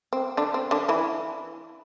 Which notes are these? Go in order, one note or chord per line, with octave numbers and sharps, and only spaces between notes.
C4
D3 D4
C4
D3 D4
E3 E4